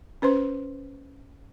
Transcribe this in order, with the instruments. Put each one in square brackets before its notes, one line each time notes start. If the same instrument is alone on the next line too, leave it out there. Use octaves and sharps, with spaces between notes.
[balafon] C#4 B4 C5 C6